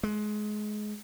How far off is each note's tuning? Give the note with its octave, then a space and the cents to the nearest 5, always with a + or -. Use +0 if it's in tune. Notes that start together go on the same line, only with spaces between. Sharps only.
G#3 +25